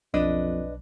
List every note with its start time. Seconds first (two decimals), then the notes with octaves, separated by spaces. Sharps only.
0.14 B1 F2 D4 B4 D#5